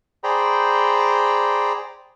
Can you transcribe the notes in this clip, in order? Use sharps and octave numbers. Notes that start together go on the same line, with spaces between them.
G#4 C5 D5 G5 A#5 B5